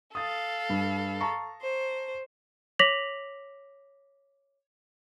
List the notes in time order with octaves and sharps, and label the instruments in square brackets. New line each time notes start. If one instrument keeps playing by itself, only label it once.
[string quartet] A4 F5 [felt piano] D#6 A6
[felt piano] G2
A5 A#5 C#6
[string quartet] C5
[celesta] C#5 D6 A#6 B6 F7 F#7